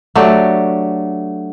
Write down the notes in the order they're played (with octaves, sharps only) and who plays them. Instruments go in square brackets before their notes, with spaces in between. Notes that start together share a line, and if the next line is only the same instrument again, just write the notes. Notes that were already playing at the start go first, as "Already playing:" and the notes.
[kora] F#3 A3 D4 G4